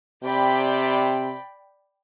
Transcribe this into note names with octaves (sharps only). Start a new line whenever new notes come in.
C3 D5 G5 B5